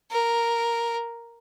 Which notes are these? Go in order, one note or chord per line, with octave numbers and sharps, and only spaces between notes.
A#4